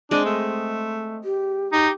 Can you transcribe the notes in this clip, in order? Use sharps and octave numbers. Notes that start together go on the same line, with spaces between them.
G#3 C4 D4 D#5
A3
G4
D#4 G4